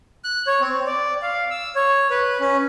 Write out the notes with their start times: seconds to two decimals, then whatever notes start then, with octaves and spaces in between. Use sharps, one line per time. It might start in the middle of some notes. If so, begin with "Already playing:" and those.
0.24 F#6
0.47 C#5
0.61 C4
0.86 D5
1.22 F5
1.50 E6
1.75 C#5
2.10 B4
2.40 C#4